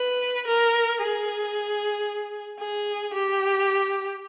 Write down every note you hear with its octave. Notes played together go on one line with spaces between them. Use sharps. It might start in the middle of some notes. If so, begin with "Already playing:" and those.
Already playing: B4
A#4
G#4
G#4
G4